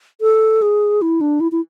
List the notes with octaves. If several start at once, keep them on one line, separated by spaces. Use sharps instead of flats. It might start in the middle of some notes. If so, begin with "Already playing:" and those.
A4
G#4
E4
D4
E4
E4